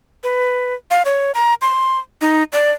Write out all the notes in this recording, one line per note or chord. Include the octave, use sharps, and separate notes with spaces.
B4
F5
C#5
A#5
C6
D#4
D5